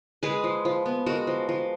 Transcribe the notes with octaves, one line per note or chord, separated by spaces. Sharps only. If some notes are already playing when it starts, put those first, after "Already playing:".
G#3 G#4 B4
F3
F3
B3
G#3 F#4 A#4
F3
F3